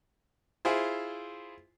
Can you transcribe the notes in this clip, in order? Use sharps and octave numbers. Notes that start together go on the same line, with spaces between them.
E4 F4 G#4 C5